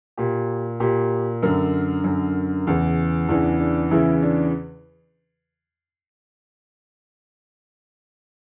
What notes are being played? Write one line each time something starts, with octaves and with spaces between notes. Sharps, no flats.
A#2 G4
A#2 G4
F#2 D3 A#4
F#2 D3
E2 C#3 E3
E2 C#3 E3 D4
D4
E2 C#3 E3 E4
D4